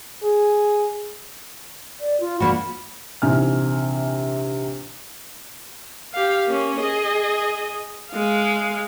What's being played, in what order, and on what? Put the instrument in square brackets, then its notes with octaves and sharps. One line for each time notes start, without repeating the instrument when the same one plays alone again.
[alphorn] G#4
[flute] D5
F4
[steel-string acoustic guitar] A#3 D4 F#4 [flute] B5
[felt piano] A#1 C3 E3 D#4 G#5 F6
[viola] G4 F5
A#3 C#4
G#4 D#5
G#3 F5